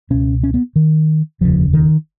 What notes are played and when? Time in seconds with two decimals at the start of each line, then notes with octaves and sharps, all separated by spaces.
0.10 C#2 B2 C#4
0.43 C#4
0.54 B3
0.76 D#3
1.41 F1 D#2 C#3 F3
1.73 D#3